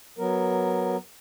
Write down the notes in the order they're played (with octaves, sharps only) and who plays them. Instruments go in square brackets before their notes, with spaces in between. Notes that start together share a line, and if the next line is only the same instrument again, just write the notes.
[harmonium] F#3 B3 A#4